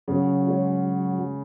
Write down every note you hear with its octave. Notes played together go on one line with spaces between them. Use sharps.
C#3 F#3
G#3 C#4